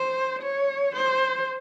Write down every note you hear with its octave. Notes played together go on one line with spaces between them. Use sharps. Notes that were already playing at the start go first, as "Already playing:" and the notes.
Already playing: C5
C#5
C5